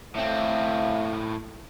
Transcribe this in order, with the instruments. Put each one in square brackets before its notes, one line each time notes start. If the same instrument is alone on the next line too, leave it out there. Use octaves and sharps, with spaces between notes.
[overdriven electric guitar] A2 C4 [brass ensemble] A3 C#5 F5 [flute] E5